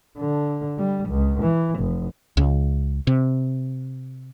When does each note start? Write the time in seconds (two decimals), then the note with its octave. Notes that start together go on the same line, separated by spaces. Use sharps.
0.18 D3
0.78 G3
1.09 C#2
1.42 E3
1.79 F1
2.37 C#2
3.07 C3